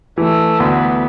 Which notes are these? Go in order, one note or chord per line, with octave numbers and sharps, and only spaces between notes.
E3 A3
D2 B3